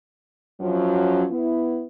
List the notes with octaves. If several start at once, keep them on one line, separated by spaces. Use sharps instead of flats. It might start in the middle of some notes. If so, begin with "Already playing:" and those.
F#2 F3 F#3 C#4
B3 E4